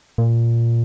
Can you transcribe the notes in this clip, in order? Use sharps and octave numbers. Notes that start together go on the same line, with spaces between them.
A#2